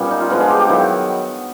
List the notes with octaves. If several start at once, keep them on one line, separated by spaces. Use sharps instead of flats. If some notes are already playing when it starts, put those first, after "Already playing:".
Already playing: A#2 G3 B3 C#4
D#4
F4
D3 F3 G#3 B3 D#4
G#4
G4
G4
D#3 F#3 B3 E4